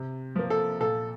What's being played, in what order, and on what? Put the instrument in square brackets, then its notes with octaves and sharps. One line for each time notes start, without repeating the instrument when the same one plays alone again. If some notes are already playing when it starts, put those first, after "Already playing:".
Already playing: [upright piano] C3
F3 A#3
[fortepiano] A4
[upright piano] A#2 [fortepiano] A4